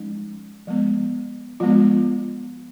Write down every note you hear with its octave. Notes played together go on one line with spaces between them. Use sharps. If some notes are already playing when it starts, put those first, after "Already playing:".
Already playing: F3 G#3 C#4 D#4
F3 G#3 B3
F3 G#3 B3 F4